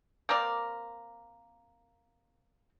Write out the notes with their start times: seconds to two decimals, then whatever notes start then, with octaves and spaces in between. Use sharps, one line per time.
0.29 A#3 C4 A#4 D5